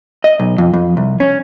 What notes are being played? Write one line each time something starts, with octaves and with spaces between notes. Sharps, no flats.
D#5
B1
F2
F2
C2
C#4